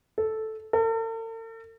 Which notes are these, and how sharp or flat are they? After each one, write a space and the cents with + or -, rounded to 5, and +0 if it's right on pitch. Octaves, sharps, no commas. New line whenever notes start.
A4 -5
A4 +45